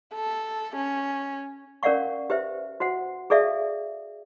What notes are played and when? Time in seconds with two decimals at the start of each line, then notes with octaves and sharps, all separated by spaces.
0.15 A4
0.76 C#4
1.83 C#4 A#4 D5 F5 F#5 C#6
2.30 G4 B4 C5 E5
2.80 F#4 C5 F#5
3.30 G#4 A4 D5 E5 F5